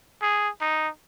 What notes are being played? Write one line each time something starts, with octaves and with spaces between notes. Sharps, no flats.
G#4
D#4